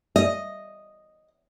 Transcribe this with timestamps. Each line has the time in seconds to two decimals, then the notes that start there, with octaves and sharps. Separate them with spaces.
0.16 D#5